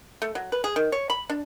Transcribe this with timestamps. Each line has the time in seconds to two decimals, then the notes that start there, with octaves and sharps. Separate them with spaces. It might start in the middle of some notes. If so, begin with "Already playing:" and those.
0.22 A3
0.35 F#3
0.52 B4
0.64 G#4
0.76 D#3
0.92 C#5
1.10 B5
1.30 D4